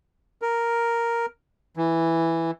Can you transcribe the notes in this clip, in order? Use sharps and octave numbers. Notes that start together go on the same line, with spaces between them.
A#4
E3